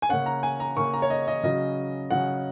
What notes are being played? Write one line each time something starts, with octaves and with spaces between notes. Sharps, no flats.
G#5
C#3 A#3 C#4 F#5
A#5
G#5
A#5
C#3 A#3 C#4 C#6
A#5
C#5
D#5
D#5
C#3 F#3 C#4 D#5
C#3 F#3 C#4 F#5